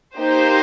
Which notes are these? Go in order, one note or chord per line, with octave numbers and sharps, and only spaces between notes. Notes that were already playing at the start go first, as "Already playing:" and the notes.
A#3 D#4 G4 C5